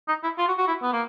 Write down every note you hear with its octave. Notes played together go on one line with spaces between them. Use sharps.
D#4
E4
F4
F#4
F#4
E4
B3
A#3